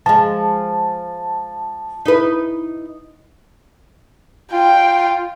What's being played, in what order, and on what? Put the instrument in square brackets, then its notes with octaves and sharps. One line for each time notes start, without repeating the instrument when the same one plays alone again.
[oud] F3 G#3 [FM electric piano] A5
[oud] D#4 E4 B4
[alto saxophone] F4 [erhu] G5